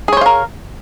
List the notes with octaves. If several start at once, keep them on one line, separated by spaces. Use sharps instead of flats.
G#4 A#4 C5 C#5 F5